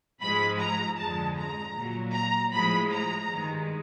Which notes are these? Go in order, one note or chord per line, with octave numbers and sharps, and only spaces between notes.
G#2 F3 G#3 B5
A#5
F2 D3 F3 G#3 A5
A#5
A#2 F#3
A#5
A2 F3 G#3 B5
A#5
G2 D#3 G#3